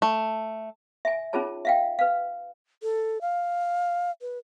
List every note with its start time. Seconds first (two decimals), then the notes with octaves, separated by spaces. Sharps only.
0.02 A3
1.05 E5 G#5
1.33 C#4 D#4 F4 G#4 C#5 A5
1.65 E5 F5 G5
1.99 B4 F5
2.83 A4
3.21 F5
4.21 B4